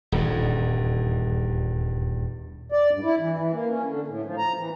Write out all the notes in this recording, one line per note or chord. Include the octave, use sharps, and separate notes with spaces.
D#1 E2 G2
D5
G2
E4
E3
E3
A#3
C#4
D3
A2
F3
A#5
E3